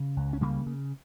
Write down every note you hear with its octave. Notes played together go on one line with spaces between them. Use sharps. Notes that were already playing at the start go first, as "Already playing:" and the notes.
Already playing: C#3
C#2
C#4
C#3 G3 A#3
C#3